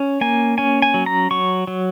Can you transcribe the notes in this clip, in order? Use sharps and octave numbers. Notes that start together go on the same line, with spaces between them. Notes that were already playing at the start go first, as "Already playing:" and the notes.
Already playing: C#4
A#3 G#5
C#4 G#5
G#5
F#3
A#5
F#3 C#6
F#3